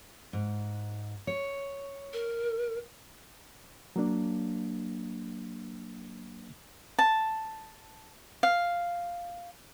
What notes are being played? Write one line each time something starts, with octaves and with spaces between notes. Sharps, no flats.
G#2
C#5
A#4
F#3 A#3 D4
A5
F5